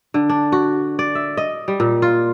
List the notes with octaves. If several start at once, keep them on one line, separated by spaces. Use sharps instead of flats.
D3
D4
F#4
D5
E5
D#5
G3
A#2
F4